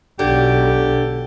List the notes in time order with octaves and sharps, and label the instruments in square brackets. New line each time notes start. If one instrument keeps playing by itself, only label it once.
[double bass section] B1 [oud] D3 [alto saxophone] G4